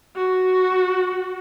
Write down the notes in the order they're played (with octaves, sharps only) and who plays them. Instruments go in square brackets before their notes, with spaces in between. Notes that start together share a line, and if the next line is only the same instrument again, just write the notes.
[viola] F#4